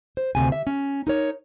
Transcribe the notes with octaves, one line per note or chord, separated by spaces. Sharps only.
C5
D2 C3 G#5
E5
C#4
D#4 A#4 C#5